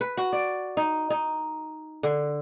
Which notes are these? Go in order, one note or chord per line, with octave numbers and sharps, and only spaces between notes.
B4
F#4
D5
D#4
D#4
D3